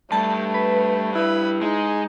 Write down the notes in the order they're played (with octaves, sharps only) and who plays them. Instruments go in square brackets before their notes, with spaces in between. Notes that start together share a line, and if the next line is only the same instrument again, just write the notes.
[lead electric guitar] G2 G3 [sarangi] A3 [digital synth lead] A5
[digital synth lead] B4
[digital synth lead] E4 [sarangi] B4
[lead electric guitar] G#3 [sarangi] D#4